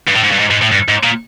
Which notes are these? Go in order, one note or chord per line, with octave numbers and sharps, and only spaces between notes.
G2
A2
G#2
G2
G#2
G#2
A2
G2
G#2
A#2